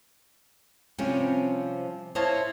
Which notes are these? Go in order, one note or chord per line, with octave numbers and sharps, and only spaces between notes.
C3 F3 G3 C4 C#4
E4 C5 C#5 D#5 F5 A5